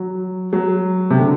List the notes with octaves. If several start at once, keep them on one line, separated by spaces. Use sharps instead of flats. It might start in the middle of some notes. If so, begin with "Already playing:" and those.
Already playing: F#3
F#3
C3
D3